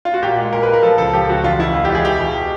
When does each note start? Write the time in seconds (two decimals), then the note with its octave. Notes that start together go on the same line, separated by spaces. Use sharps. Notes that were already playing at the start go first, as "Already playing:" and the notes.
0.05 F4
0.14 F#4
0.22 A#2 G4
0.38 G#3
0.52 A#2 A#4
0.63 B4
0.68 A#2
0.73 A#4
0.83 F3 A4
0.98 C#2 A4
1.13 F3 G4
1.29 C#2 F#4
1.44 E2 F4
1.59 B2 E4
1.74 E2 F4
1.85 G4
1.89 E2
1.95 G#4
2.05 B2 G4
2.20 B2